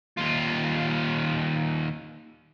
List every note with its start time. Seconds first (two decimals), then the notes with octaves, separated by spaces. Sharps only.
0.17 D#2 F4